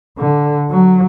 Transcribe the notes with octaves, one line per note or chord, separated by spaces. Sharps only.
D3
F#3